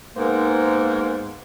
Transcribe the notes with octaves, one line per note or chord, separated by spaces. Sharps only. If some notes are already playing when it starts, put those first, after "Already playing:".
G#2 A#3 B3 A#4 C5